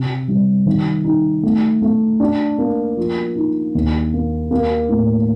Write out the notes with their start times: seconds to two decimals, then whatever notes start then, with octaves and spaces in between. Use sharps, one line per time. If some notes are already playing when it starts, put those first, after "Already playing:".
Already playing: C3
0.28 G3
0.66 D#3
1.04 D#4
1.43 A3
1.82 A3
2.20 D4
2.58 A#3
2.97 F3
3.36 D#4
3.75 D#2
4.13 A#3
4.51 A#3
4.89 A2